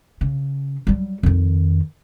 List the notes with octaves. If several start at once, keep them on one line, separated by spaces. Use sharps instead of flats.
C#3
F#3 G3
F2 D#3